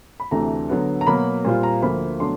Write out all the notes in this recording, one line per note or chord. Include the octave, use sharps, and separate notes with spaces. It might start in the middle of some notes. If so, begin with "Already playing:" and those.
B5
D2 C3 E3 A3 D4 A#5
D3 F#3 B3
A#5
B2 F#3 A#3 B5
A#2 G3 C4 F4
A#5
D2 D3 F3 A#3 B5
B2 F#3 A3 D4 C6